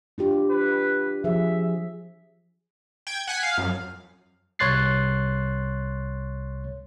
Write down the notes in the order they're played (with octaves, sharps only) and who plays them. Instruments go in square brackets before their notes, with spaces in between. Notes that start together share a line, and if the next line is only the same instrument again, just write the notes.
[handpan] D4 F4 G4
[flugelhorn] B4
[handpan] F3 G#4 [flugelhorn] E5
[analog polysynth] G5 G#6
F#5 G#5 B6
F5
F#2
[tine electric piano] C2 C#5 C6 F#6 A6 C7